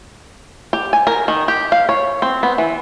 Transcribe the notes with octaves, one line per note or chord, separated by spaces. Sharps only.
G4
G#5
A#4
D#3
G4
F5
C#5
C4
B3
E3